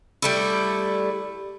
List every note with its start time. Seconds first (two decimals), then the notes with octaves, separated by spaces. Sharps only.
0.22 G3 A3 E4